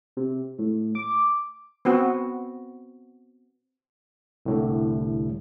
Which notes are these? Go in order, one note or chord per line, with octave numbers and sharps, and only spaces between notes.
C3
A2
D6
B3 C4 F#4
C2 A2 D3